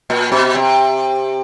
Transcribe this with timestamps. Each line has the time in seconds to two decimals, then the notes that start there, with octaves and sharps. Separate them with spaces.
0.10 A#2
0.32 B2
0.55 C3